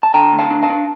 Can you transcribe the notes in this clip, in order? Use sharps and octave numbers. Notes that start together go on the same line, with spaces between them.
A5
D3 G5 A#5
D2
F5 A5
D4
F5 A5
D4